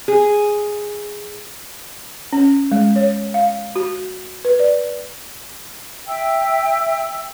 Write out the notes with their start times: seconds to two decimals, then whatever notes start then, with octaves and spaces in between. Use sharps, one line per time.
0.08 G#4
2.33 C#4
2.72 G#3
2.96 C#5
3.34 F5
3.76 F#4
4.45 B4
4.60 D5
6.07 E5 G5 E6